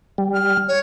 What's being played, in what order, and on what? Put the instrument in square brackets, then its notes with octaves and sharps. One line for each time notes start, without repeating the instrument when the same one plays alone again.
[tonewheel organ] G3
[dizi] F6
C#5